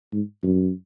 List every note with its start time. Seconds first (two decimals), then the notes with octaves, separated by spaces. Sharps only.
0.13 G#2
0.43 F#2